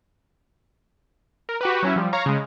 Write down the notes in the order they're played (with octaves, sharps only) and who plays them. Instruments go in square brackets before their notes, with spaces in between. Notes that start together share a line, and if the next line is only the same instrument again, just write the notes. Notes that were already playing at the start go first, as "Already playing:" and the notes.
[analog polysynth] A#4
F#4 G4 B4
F#3 C#4 E4
F3 G3
C#5 F5 A#5
C#3 G#3